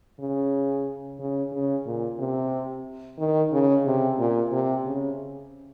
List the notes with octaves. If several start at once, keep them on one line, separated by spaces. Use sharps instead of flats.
C#3
C#3
C#3
A#2
C3
D#3
C#3
C3
A#2
C3
C#3